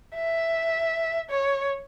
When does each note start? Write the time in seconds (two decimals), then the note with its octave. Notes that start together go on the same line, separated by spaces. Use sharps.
0.15 E5
1.30 C#5